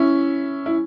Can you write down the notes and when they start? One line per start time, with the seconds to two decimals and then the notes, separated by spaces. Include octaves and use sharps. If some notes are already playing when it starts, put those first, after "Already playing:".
Already playing: C#4 E4
0.66 E4